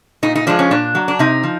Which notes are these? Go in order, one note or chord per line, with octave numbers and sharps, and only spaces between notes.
A#2 D#4
D#4
F3 G#3 D4
C#4
A#2 D4
F#3
D4
C3 D#4
F3